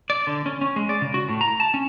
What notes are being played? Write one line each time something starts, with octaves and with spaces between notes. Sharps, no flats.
D5
D3
C#4
C#4
G#3
D5
C#3
F#4
A2
A#5
A5
C#4